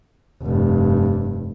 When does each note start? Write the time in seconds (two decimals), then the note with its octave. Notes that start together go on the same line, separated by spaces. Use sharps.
0.42 F1 G2